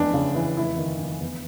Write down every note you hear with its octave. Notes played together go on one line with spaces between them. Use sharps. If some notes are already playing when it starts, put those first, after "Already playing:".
Already playing: F1 E2 D4
C#3
E3
F1 E4
D#3
F1
E2